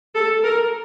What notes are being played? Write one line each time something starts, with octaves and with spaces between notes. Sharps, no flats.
A4
A#4